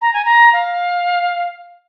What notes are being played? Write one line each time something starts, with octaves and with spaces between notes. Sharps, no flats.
A#5
G#5
A#5
F5